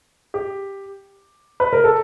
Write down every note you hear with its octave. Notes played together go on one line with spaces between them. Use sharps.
G4
B4
A#4
A4